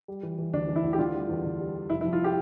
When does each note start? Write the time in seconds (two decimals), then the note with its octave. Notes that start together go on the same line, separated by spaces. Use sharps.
0.08 G3
0.23 E3
0.38 E3
0.53 D2 D4
0.68 E3
0.76 E4
0.84 D2
0.93 G4
0.99 D3 F4
1.14 G3
1.29 E2
1.45 D3
1.60 G3
1.75 G3
1.90 F1 E4
2.01 E4
2.05 F2
2.13 F4
2.24 G4